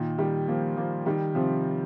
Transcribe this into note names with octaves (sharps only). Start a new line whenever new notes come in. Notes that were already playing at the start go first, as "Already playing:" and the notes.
Already playing: A#2 D#3
D#3 G3
F3 A#3
F3 A#3
D#3 G3
C3 F3